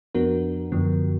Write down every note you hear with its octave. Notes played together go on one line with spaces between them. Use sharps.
F2 F3 B3 D4 F#4 A#4
F#2 D3 F3 B3